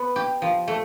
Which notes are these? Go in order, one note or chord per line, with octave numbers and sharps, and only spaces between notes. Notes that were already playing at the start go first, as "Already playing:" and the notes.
Already playing: B3
G4
F3
A3